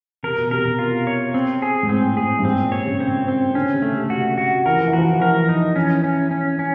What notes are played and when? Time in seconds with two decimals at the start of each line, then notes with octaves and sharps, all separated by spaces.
0.23 C3 A#4
0.38 B2
0.51 C3 A#4
0.65 B2
0.79 F4
1.07 C#5
1.34 C4
1.62 G#4
1.83 G#2
1.89 A2 C4
2.17 A2 G#4
2.39 G2
2.45 G#2 C4
2.58 A#2
2.72 C#5
2.86 C#3
3.00 C4
3.28 C4
3.55 D3 C#4
3.74 C#3
3.82 A3
3.92 C3
4.10 C3 F#4
4.38 F#4
4.66 E3 A#4
4.77 F3
4.87 E3
4.93 F3 F#4
5.09 E3
5.20 F3 A#4
5.31 E3
5.49 D#4
5.76 E3 C#4
6.04 C#4
6.31 C#4
6.59 C#4